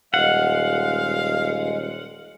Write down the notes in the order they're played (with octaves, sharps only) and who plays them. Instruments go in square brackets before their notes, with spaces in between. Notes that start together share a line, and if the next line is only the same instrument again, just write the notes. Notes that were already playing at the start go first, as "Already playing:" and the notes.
[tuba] D#1 [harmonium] G#3 [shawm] F5 [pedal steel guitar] F#5